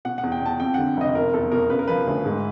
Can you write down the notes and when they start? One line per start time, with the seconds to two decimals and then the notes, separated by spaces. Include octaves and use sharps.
0.05 B2 F#5
0.18 F#5
0.23 E2
0.32 G5
0.41 B2 A5
0.60 F2 G5
0.74 D3 F#5
0.97 F1 D#5
1.15 B2 A#4
1.33 E2 A4
1.52 B2 A#4
1.70 C#3 B4
1.79 A#4
1.88 F3 B4
2.07 D2
2.26 G#2